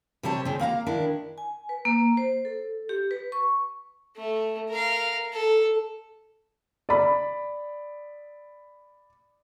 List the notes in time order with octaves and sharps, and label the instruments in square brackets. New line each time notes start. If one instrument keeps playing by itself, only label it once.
[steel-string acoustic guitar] C3 G3 C5 C#5 A5
C#3 C4
A#3 F5 F#5 A#5
D#3 D4 E4
[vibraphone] G#5
B4
A#3
C5
A4
G4
B4
C#6
[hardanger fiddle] A3
A#4 F5
A4
[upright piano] D5 B5